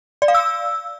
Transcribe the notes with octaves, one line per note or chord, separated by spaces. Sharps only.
D5
F5
E6